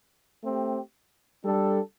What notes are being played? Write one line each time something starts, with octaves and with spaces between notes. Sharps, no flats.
A3 C4 G4
G3 D4 A4